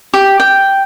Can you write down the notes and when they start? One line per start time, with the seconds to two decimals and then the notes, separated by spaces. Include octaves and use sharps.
0.14 G4
0.40 G5